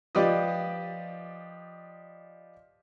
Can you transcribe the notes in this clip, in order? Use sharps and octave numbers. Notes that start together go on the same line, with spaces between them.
F3 G4 B4 D5 D#5